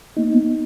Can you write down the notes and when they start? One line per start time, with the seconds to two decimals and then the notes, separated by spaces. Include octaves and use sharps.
0.17 A#3 D#4
0.32 B3